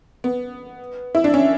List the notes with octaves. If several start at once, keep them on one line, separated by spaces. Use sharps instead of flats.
B3
E4
D4
C#4